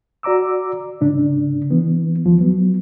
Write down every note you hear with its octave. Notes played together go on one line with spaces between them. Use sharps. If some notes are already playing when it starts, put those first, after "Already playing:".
F#4 D5 A#5 D6 E6
G#2 C#3 D4
E3 B3
D#2 F3
F#3 B3